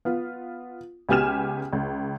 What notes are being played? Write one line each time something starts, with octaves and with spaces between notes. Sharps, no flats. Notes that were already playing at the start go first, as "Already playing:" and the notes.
B3 F4
C#2 B3 G4 G#5 F6 E7
C#2